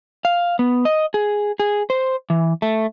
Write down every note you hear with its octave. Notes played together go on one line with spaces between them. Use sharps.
F5
B3
D#5
G#4
G#4
C5
E3
A3